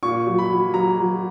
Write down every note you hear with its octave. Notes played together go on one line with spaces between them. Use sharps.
A#2 C#6
F#3
B5
F#3
F#3 A#5
F#3